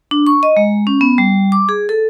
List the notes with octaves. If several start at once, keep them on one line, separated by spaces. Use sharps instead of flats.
D4
C#6
D#5
G#3
C#4
B3
G3
D6
G#4
A4